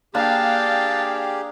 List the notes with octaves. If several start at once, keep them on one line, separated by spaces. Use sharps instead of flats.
A#3 D4 G4 G#4 F5 G5 A5